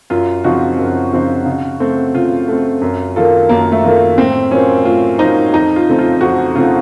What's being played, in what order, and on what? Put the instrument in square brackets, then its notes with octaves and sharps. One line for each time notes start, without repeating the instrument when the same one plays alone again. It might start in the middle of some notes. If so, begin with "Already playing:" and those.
[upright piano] F#2 [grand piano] F4
[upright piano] C#3 F3 C4 D#4 [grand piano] F#4
[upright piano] F#2
C#3 F3 C4 D#4
C#3
A3 C4
[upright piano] C#3 [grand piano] F4
[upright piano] A3 C4
F#2
D#3 A#3 F4 A4
[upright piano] F#2 [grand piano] A#3
[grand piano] A3
[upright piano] D#3 A#3 F4 A4
[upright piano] A2 [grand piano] C4
[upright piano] F#3 A#3 F4 C5 [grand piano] C#4
[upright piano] A2 [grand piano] F4
[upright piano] F#3 A#3 F4 C5 [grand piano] D#4
[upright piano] F2 [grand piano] D#4
[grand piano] F4
[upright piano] C#3 A3 C4
[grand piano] F4
[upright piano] F2 [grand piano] F#4
[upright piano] C#3 A3 C4 [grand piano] F4